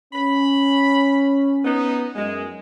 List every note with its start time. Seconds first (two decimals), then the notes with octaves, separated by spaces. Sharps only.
0.13 C#4 B5
1.65 B3 D#4
2.16 F#2 G#3